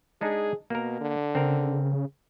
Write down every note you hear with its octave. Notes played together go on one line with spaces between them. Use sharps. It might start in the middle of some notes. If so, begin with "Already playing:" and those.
G#3 D4 D#4 G#4
B2 A#3 A#4
D3
C#3 C4 A#4